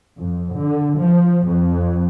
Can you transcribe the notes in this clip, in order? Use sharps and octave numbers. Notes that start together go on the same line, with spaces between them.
F2
D3
F3
F2